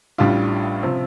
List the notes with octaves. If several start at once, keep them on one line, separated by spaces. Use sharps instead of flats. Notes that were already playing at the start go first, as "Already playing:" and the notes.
A1 A2 G3 D4 F4
C3 F3